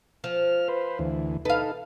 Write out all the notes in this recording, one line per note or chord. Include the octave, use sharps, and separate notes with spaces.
F3 F6
B4 C5
D2 E3
D#4 A4 B4 F5